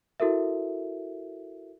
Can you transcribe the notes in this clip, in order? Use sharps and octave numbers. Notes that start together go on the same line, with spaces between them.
E4 F#4 A4 A#4 E5